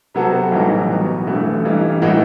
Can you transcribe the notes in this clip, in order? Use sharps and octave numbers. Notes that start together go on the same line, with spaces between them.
C3 F#3 B3 F#4 A4
B1 A2 E3 G3 D#4
B2 F#3 B3
A1 G2 E3 A3
G2 E3 G3 D#4
A2 E3 A3 D#4 F#4